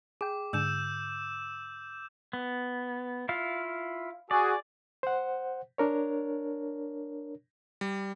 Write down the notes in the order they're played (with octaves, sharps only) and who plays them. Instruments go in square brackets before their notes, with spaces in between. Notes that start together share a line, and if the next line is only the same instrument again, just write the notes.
[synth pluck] G#4 G5 [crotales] D6
[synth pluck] G#2 D3 [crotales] E6 G6 E7
[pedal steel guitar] B3
E4 F4 F5
[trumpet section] F#4 G#4 [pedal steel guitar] D5
[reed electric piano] C5 F#5
D4 A#4 C#5
[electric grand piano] G3